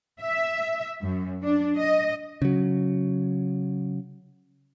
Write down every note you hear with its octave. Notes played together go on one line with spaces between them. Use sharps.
E5
F#2
D4
D#5
C#3 F#3